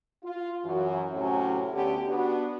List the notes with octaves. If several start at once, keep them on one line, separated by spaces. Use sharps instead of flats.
F4
F#2 E3 F#4
A2 C3 F#3 C#4
D2 D3 B3 C#4 G4
B3 D4 F#4